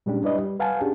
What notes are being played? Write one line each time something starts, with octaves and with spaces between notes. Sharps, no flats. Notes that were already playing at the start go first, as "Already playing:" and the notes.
A#2 G3 G#3 C#4 D4 G4
G3 D4 E4 B4 D5 D#5
G3
B4 F5 F#5 G#5 A5
C#4 D4 G4 G#4